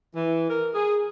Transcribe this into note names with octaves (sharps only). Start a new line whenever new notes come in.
E3
A#4
G#4